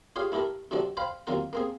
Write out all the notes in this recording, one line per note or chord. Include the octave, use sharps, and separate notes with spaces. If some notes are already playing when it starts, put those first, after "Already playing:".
F4 G4 G#4 C#5 F5
A3 E4 G4 A4 A#4
C3 F#3 C4 D4 F#4 A4
C5 F5 G5 B5 C6
D#2 F#3 C4 F4 A#4 F#5
A#3 C4 G#4